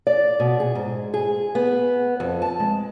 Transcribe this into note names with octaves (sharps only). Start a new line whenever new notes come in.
D5
B2
G#4
G#2
G#4
B3
F2
A5
G#3